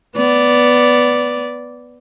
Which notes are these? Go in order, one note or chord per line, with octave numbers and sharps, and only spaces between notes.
B3 D5